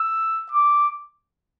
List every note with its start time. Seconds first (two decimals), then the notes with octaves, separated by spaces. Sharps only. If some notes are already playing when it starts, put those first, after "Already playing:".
Already playing: E6
0.51 D6